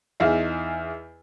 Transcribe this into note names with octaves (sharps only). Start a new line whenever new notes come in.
E2 D#4 G#4 E5 F5